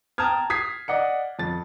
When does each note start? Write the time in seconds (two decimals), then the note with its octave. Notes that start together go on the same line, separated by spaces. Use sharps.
0.18 G5 A5 A#5 D#6 F6 G#6
0.50 D#6 G#6 B6 C7
0.88 D5 D#5 F#5 C#7
1.39 F2 A6